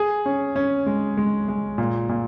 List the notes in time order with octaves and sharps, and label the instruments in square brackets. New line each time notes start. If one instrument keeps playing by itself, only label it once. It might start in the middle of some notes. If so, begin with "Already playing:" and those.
Already playing: [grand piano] G#4
C#4
C#4
G#3
G#3
G#3
A#2
A#2